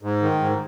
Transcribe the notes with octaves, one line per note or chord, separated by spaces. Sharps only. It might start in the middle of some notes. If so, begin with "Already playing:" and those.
G#2
D#3
G#2